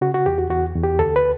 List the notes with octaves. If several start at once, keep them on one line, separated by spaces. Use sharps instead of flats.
C#3 F#4
F#4
E2 G4
F#4
E2 F#4
E2
G4
D2 A4
B4